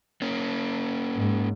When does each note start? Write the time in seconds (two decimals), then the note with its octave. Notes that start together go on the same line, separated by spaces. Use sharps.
0.22 A#3 C#4
1.17 G#2